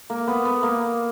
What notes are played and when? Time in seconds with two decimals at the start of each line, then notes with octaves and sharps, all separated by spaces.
0.10 A#3
0.27 B3
0.45 B3
0.63 A#3